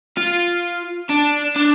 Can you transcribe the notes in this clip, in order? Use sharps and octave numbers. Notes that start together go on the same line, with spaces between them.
F4
D4
D4